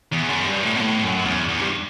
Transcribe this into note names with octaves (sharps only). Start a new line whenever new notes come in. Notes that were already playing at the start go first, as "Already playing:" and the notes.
E2
F#2
G2
A2
B2
A2
F#2
E2
E2
G2